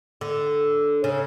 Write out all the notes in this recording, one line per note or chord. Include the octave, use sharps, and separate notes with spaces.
D3
C#3